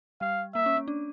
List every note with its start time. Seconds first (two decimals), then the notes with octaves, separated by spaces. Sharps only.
0.21 G3 F5
0.54 A#3 E5
0.66 C#4
0.77 C#4
0.88 D4